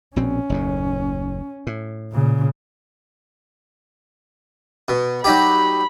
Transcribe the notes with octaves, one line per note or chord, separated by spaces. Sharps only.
A#1 B2 C4 C#4
F#1 D#2 A2
A2
A#2 C#3
B2
F#3 D#4 G4 B5